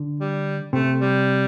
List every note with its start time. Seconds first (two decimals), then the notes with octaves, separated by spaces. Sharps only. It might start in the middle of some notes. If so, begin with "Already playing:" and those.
Already playing: D3
0.20 G3
0.73 C3 A3
1.00 G3